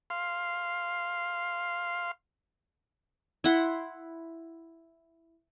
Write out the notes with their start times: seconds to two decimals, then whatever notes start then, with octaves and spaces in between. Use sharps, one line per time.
0.10 F5 C6
3.44 E4 F#5 C6